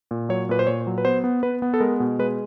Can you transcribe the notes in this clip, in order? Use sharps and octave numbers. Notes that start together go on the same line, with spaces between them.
A#2
F#3 C#5
A#2 B4
C5
A#2 C#5
F#3
B4
B3 C5
B3
B3 B4
B3
A4
G#3 A#4
B2
G#3 B4